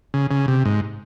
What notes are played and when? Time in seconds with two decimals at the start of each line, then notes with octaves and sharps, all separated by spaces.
0.14 C#3
0.31 C#3
0.48 C3
0.65 G#2